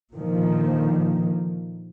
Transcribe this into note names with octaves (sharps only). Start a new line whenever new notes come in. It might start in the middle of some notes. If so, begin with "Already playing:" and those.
A#2 D3 D#3 F3 A#3